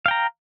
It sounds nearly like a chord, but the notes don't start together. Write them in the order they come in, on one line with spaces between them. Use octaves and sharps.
F5 G5 A#5